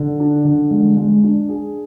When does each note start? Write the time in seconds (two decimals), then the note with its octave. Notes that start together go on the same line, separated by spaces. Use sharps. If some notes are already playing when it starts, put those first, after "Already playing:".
Already playing: D3
0.20 D4
0.45 D3
0.71 G#3
0.97 G#3
1.24 D4
1.49 G#4